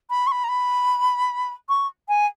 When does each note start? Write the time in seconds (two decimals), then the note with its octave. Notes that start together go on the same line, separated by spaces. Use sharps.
0.10 B5
0.27 C#6
0.32 B5
0.44 A#5
0.49 B5
1.69 C#6
2.08 G#5